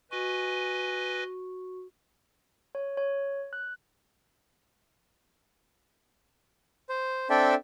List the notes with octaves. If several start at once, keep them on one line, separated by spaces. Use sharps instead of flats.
F#4 B4 D#5 G#5 C#6
C#5
C#5
F#6
C5
C4 D4 A4 D5 E5 G5